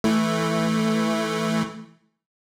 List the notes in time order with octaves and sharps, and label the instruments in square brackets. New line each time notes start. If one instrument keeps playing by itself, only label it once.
[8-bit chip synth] E3 A3